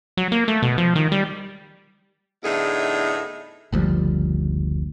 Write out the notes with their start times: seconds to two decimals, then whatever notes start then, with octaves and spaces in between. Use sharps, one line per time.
0.17 F#3
0.32 A#3
0.48 A3
0.62 B2
0.78 F3
0.95 D#3
1.12 G3
2.44 E2 A2 D3 D#4 G#4 E5
3.72 F#1 D2 F3 G3